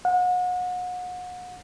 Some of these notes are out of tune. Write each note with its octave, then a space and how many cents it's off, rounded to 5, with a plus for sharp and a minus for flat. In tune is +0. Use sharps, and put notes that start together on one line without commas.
F#5 -35